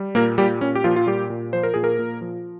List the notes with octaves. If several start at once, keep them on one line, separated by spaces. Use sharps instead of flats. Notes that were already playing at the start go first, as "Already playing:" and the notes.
Already playing: G3
A#2 A#3 A#4
A#2 G3 G4
A#2 C#4
G4
A#2 F3 F4
F4
A#2 G3 G4
A#2
F3 C5
A#4
A#2 G#4
A#3 A#4
A#2
F3